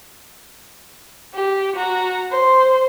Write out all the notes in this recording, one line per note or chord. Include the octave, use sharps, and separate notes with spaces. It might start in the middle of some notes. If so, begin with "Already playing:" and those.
G4
F#4 A#5
C5